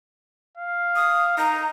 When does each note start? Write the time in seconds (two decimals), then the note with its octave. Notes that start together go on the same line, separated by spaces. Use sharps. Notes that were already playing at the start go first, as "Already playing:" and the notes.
0.57 F5
0.96 D#6
1.38 D#4 A#5